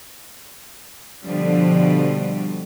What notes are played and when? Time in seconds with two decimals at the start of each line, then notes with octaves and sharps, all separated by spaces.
1.25 B2 D3 F3 G3